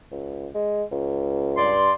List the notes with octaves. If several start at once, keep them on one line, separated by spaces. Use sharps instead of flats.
C#2
G#3
C#2
G2 D5 C6